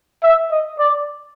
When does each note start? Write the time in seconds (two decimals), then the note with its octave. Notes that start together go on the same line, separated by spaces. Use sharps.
0.23 E5
0.51 D#5
0.79 D5